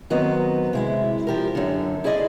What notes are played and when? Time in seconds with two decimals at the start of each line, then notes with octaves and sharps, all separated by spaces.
0.10 D#3 F#3 B3 C4 D#5
0.73 C3 G#3 E4
1.27 F3 G4 A#4
1.55 F#2 D3
2.04 E4 G#4 C5 D5 D#5